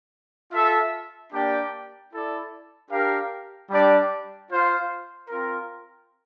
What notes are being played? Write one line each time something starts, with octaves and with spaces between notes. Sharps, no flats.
F4 A4 E5
A#3 D4 G4 D5 G5
E4 A4 D5
D4 G4 A#4 F5
G3 D4 G4 D5
F4 C5 F5
C4 F4 A#4